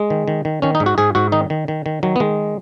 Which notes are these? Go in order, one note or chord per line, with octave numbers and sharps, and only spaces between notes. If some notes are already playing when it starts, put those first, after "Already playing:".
Already playing: G#3
D#3
D#3
D#3
D#3 C#4
D#4
G#2
F#4
G#2 G#4
G#2 F#4
D#3 D#4
D#3
D#3
D#3
D#3 F#3
B3
D#3 G#3